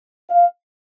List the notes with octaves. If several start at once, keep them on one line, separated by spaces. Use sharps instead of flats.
F5